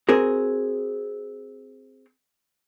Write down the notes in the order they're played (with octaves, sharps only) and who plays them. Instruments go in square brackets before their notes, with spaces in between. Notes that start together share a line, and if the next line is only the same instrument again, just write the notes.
[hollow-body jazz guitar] C4 F#4 G#4 A#4